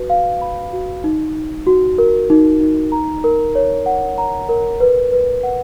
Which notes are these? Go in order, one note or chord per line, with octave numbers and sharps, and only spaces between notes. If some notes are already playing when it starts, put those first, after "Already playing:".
Already playing: F#4 B4
F5
B5
F#4
D#4
D#4
F#4
A#4
D#4
D#4
A#5
A#4
C#5
F#5
A#5
A#4
B4
B4
F#5